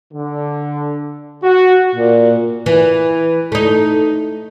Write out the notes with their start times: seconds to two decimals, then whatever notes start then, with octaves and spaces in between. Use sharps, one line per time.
0.13 D3
1.43 F#4
1.96 A#2
2.66 E3
3.52 A3 D#4